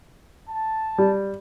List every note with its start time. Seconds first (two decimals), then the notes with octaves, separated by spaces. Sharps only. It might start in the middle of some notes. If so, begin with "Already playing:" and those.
0.49 A5
0.98 G3